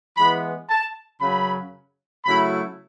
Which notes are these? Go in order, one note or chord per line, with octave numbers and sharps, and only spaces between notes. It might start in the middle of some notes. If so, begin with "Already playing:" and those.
E3 G#3 B3 E4 B5
A5
F#2 C#3 F#3 B5
C#3 F#3 A3 E4 B5